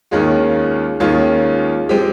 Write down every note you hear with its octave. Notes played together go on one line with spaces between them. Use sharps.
D#2 D#3 G#3 C#4 F4
D#2 D#3 G#3 C#4 F4
F3 G#3 C4 G4